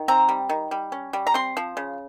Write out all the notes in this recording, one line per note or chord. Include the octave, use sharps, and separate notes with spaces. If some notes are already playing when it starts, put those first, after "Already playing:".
Already playing: D#3
C4 A#5
G3
D#3
G3
C#4
G3
A#5
C4 C6
F3
C#3